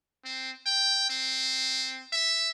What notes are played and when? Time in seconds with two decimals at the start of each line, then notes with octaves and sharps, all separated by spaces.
0.25 C4
0.66 G5
1.10 C4
2.12 E5